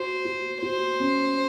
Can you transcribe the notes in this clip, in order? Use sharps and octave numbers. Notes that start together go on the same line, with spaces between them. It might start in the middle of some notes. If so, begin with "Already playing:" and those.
Already playing: F#4 C5
F#4
F#4 C5
C#4